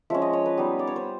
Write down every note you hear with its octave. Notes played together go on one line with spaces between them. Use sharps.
F3 G#3 C#4 E5
D#5
C#5
B4
G3 B3 D#4
D5
C#5
C5